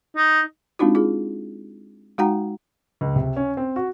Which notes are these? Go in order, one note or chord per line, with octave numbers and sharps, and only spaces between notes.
D#4
G#3 C4 D4 D#4 F4 F#4
F4 G#4
G#3 D#4 F#4 F#5 G5 A#5
C#2
C3
C#4
C4
F#4